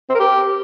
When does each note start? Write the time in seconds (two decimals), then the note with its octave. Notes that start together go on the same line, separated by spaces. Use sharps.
0.09 C4
0.14 A#4
0.19 G4